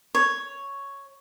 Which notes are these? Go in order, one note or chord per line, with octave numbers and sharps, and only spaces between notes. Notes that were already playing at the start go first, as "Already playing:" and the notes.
C#5